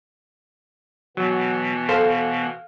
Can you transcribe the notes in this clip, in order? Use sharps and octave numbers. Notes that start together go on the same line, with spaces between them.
B2 E3 F#3 B3
A4 C5 F5